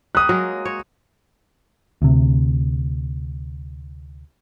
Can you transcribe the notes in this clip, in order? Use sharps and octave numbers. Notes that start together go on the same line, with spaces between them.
G3 A#3 D#6 F#6
F#3 G#3 A#4
C#5
D2 C3